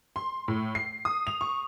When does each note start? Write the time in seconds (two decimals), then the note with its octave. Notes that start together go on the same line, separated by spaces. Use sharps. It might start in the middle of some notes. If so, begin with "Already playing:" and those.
0.16 C6
0.48 A2
0.75 C7
1.05 D#6
1.27 F7
1.41 C#6